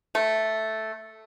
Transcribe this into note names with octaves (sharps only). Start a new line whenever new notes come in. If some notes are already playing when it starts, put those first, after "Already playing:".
A3